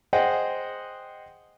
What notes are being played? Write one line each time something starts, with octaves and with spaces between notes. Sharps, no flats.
G#4 C5 D#5 F#5 G5